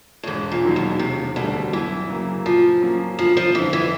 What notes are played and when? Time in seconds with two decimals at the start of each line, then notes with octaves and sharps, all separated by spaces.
0.23 A2
0.27 E1 G#2
0.52 A#2
0.64 D#2 D#3 F#3
0.76 B2
0.99 E1 C3
1.36 D2 B2 D3 G3
1.73 F#2 E3
2.09 C#3 F#3 A#3
2.46 A#2 F3
2.82 F#3 A#3 C#4
3.19 G1 F3
3.37 F3
3.55 F2 D3 E3
3.73 E3